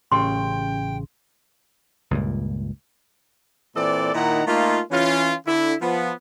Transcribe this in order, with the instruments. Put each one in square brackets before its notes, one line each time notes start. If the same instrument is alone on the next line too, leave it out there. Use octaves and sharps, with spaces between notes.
[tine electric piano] A1 C#3 [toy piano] G4 C6 [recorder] G5
[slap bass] C#2 G2 A#2
[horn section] A#2 E3 C4 A4 D5
A#2 D#3 D#4 E4 F#5 A#5
A3 A#3 D#4 F4
E3 C#4 F4
D3 E4
F3 B3